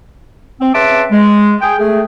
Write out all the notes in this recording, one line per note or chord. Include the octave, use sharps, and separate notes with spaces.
C4
C#3 B4 E5 A5 C6 D6
G#3
G#4 G5
A3 G#4